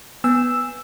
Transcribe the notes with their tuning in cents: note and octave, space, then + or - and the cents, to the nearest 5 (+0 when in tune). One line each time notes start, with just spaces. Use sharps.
B3 +0 G#5 -20 E6 +0